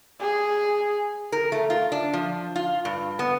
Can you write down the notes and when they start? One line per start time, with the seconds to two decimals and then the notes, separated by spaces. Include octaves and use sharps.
0.20 G#4
1.32 A#4
1.52 A3
1.70 F4
1.92 D4
2.13 F3
2.56 F4
2.85 G2
3.19 B3